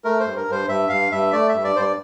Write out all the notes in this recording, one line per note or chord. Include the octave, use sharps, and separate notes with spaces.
A3 A#4
C5
G2
A#4
G2 C5
G2 E5
G2 F5
G2 E5
A3 D5
G2 E5
D5
G2 C5
D5